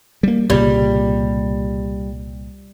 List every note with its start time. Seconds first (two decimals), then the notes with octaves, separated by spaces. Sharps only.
0.23 G3 A#3
0.50 C2 A#2 C#3 G3